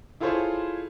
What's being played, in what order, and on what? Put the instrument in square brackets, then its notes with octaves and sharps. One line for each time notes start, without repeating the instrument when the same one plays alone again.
[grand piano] E4 F4 G#4 A4 C5 C#5